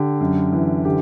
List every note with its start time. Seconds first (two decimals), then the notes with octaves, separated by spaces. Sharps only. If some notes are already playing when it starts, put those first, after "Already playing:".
Already playing: D3 G4
0.21 F#2
0.52 E3
0.85 D3 G4